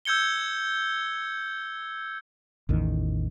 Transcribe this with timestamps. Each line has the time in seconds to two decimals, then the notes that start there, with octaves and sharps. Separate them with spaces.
0.05 E6 G6 G#6 C#7 G7
2.69 A1 E2 D#3